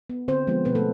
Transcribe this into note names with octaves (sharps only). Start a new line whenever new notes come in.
B3
D3 C4 C5
F3 G#3 B3
B2 B3 B4
A3 A4